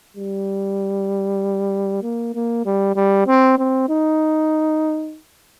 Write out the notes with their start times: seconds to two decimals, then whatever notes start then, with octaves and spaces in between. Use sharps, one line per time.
0.17 G3
2.03 A#3
2.35 A#3
2.65 G3
2.96 G3
3.27 C4
3.58 C4
3.89 D#4